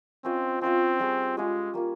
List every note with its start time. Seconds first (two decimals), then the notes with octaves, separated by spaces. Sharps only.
0.24 C4 C#4 F4 C5 D#5
0.61 C4 C#4 F4 C5 D#5
0.99 G3 C#4 F4 G#4
1.37 G3 G#3 C#4 F4 G#4
1.74 G3 A#3 F4